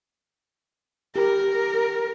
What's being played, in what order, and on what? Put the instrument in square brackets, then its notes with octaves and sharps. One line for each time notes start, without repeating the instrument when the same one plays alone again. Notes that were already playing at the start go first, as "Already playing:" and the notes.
[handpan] G4 [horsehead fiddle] A#4